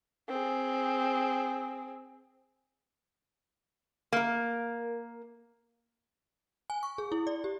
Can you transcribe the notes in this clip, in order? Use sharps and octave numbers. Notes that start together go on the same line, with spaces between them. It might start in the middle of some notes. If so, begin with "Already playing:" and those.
C4 G#4
A#3 A#4
G#5
C#6
G#4
E4
D5
G4